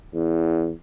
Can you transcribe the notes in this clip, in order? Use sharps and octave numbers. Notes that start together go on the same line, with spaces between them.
E2